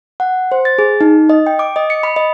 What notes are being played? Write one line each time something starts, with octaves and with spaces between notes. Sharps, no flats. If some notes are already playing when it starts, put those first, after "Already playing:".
F#5
C5
A6
G#4
D#4
D#5
G5
D6
D#5
C#7
B5
D#5